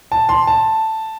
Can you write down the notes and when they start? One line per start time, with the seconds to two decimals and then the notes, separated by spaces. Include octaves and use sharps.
0.12 A5
0.29 C6
0.47 A5